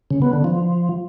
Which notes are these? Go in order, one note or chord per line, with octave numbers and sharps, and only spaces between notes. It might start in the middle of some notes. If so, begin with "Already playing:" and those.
C#3
B3
D3
F3